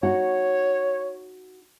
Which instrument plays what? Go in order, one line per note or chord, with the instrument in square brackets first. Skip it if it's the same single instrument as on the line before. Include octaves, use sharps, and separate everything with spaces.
[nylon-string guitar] D#4 F#4 [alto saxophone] C#5